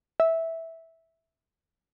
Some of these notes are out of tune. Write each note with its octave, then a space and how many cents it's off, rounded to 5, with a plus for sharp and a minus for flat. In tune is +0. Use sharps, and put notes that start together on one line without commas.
E5 -10